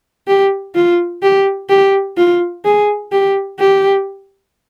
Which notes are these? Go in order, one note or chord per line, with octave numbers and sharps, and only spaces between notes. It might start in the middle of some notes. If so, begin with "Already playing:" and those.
G4
F4
G4
G4
F4
G#4
G4
G4